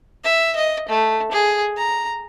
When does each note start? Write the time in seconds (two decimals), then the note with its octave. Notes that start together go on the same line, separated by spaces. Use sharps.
0.24 E5
0.56 D#5
0.88 A3
1.31 G#4
1.77 A#5